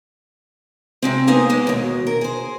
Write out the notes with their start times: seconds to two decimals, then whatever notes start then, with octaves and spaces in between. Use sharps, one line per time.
1.02 C3 G#3 C4
1.27 A#3 B3 D#4 G#4 C5 G#5
1.50 G#3 A#3 B3
1.67 D#2 B2
2.07 A#4
2.21 G#4 C5